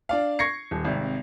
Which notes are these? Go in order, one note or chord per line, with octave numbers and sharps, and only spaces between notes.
D4 D5 F5
C#6 G#6 A#6 C7 C#7
D#1
G#1 C3